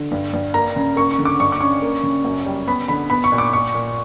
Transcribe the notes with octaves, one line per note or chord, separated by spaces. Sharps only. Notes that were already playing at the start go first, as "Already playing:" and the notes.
Already playing: D3
G2
G2
A#3 A#5
C#3
A#3 C#6
C#6
D3
D6
G2 C#6
D6
C#4 C#6
A#3
C#3
F#2
G3
B3 B5
D3 B5
B3 B5
C#6
A#2
D6
A#2 C#6
A#2